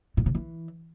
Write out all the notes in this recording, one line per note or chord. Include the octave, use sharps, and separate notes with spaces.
A2
C3
E3